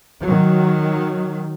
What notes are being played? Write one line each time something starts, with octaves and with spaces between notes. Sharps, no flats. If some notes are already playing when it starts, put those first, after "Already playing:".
D#3 F#3